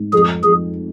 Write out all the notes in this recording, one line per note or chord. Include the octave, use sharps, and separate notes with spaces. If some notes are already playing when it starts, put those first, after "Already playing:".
Already playing: G#2
F2 G#4
F2 G#4